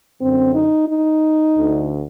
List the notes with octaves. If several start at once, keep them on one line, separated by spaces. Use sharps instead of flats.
F#2 D3 C4
D#4
D#4
D2 D3